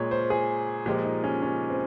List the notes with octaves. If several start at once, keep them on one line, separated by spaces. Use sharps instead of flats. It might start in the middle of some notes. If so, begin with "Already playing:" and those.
Already playing: A#2 G#3 C#5
C5
G#4
A#2 F3 G#3 G4
D#4
C#4
C#4
C4